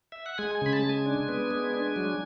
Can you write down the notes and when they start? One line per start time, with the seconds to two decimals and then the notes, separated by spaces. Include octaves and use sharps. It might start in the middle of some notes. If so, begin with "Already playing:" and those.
0.12 E5
0.26 F#5
0.38 G#3 G#5
0.55 G#5
0.62 C#3 B5
0.73 A5
0.83 G#3
0.89 G#5
1.06 D4
1.29 B3
1.51 G#3
1.74 D4
1.96 F#3